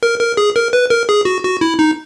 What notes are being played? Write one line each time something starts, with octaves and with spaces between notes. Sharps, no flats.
A#4
A#4
G#4
A#4
B4
A#4
G#4
F#4
F#4
E4
D#4